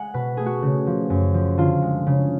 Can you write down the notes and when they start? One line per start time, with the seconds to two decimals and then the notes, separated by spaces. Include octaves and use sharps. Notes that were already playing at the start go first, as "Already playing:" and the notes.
Already playing: G#3 F#5 G#5
0.14 B2 B4
0.37 A3 G#4
0.46 F#4
0.62 C#3
0.87 F3
1.10 F#2
1.34 F3
1.58 D3 F4
1.82 G#3
2.07 C#3